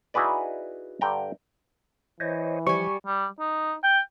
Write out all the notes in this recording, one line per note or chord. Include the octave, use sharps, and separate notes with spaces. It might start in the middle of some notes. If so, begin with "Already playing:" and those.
D#4 E4 F#4 G#4 B4 D5
G2 D3 G5 A#5
E3 C5 C#5 D#5
F3 G3 G#5 C#6
G3
D#4
G5